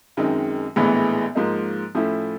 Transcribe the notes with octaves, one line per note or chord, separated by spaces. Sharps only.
F#2 D#3 G#3 C4 D#4
A#1 A2 E3 G#3 B3
G#2 F3 A#3 D#4
A2 F3 A3 C#4 E4